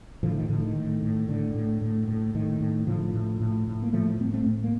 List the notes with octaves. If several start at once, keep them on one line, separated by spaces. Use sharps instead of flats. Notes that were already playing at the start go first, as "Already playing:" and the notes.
A2 D3 F3
D#3
A2 D3 F3
D#3
A2
A2
A2 D3
A2
A2
A2
A2 D#3
A2
A2 D3 F3
A2
A2
A2
A#3
A2 F3 A3
A2 A3 C4
A3 C4
A2
A#3